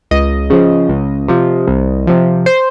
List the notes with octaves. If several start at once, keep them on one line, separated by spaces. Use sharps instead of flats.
C#2 D#5
C#3 F3
C#2
C3 F3
C2
C3 F3
C5